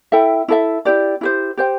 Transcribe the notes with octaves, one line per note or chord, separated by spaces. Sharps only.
E4 A4 E5 G5
E4 A4 E5
E4 G4 D5
E4 G4 C5
G4 C5 G5